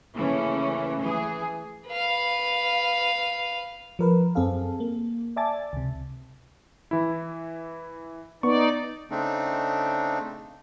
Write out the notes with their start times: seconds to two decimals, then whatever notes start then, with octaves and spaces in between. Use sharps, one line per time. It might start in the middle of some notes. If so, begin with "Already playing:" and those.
0.15 C#3 E3 A3 A#3 C#4
1.01 E3 G#4
1.87 B4 F5
3.99 F3 A#4 B4
4.35 F#2 C4 G#4 A4 F5
4.80 A#3
5.36 D5 E5 G#5 A5 D6 A6
5.73 C#2 C3
6.91 E3 E4
8.43 B3 D#4 D5 C#6
9.11 C#3 A3 C4 D4 D#4